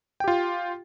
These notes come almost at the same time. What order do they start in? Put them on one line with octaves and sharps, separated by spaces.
G5 G4 F4